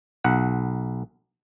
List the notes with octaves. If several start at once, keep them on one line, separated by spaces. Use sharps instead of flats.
B1 F#5